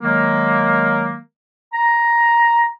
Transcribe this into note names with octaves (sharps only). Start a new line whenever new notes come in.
D#3 F#3 G#3 A#3
A#5